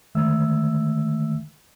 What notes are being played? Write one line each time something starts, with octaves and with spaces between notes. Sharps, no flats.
D3 D#3 G#3 A3 E5 E6